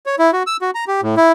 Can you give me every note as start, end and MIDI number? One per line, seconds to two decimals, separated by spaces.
0.06 0.16 73
0.19 0.31 64
0.33 0.43 66
0.47 0.57 88
0.62 0.71 66
0.75 0.85 82
0.88 1.01 67
1.02 1.15 45
1.17 1.32 64